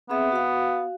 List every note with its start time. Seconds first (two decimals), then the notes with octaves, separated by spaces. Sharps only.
0.10 B3 C4 G#4 E5
0.32 F#4 F5